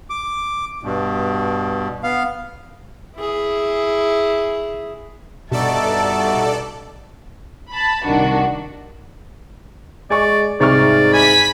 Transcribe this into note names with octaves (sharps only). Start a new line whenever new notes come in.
D6
G2 B2
B3 F5
E4 G#4
G2 B2 D#4 F#4 A4 D5 E5 A5
A5 B5
C2 D#3 D4 F#4
G#3 D5 G#5 C#6
C2 G#2 D5 C#6 F6
G#5 B5 B6